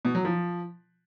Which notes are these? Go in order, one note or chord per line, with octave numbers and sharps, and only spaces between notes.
B2
F#3
F3